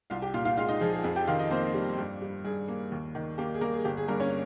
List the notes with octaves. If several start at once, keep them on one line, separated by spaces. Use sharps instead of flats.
C2 F4 F5
G4 G5
A#2 F4 F5
F4 F5
G#3 F4 F5
D#4 D#5
F3 G#4
G#4
F2 G#4
G4 G5
D#3 F4 F5
D#4 D#5
A#3 C4 C5
G3
G2
G3
G2 G#4
A#3
D#2
D#3
A#3 G4
G#4
G3 A#3 A#4
G#4
G1 G4
G#4
G2 A#3 A#4
C#4 C#5